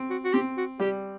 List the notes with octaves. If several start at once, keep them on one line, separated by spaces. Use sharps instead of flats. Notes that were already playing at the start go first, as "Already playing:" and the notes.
Already playing: C4
F#4
F#4
C4 G4
F#4
G3 G4